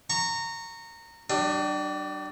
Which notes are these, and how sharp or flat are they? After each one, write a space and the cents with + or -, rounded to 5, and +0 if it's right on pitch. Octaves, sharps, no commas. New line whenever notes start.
A#5 -20 C#6 -5
G3 -35 D4 +25